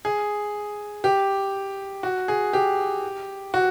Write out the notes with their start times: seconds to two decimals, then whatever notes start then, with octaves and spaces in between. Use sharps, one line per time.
0.05 G#4
1.04 G4
2.03 F#4
2.28 G#4
2.53 G4
3.54 F#4